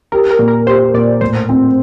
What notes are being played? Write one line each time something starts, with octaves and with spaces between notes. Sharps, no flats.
G4 A#4
A#4
A#2
A#4
G4 C5
A#2 D5
A2 C5
C4